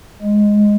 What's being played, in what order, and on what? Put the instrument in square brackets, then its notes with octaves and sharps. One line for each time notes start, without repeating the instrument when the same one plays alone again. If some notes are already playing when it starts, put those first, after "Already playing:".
[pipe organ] G#3